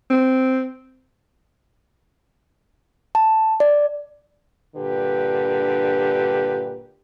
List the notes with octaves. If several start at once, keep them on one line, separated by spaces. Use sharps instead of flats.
C4
A5
D5
G2 A#2 D3 G4 B4